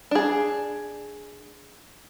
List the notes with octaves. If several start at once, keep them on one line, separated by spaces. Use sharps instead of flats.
D4 G#4